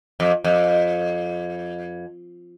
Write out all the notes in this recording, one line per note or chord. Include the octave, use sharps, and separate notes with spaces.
F2
F2